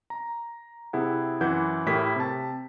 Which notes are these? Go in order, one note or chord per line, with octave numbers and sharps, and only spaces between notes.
A#5
C3 E4 G#4 F#5
F#2 E3 E4 F#5 G6
A2 E4 G4 A#4 B6
C3 A5